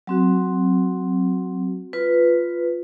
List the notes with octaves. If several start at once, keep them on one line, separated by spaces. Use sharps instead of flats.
F#3 C4 F#4
F4 B4